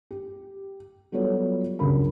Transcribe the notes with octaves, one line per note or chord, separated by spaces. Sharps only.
G4
F#3 G3 B3 F4 A4 C#5
C#2 G2 F#3 A#4 B5